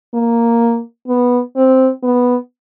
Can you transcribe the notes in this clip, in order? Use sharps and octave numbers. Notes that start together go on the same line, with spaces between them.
A#3
B3
C4
B3